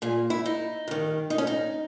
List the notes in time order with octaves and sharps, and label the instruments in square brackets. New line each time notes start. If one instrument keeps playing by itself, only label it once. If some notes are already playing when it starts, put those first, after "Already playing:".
[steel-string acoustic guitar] A#2 G#4
E4
D#4
G2 D#3
D#4
C#4
D#4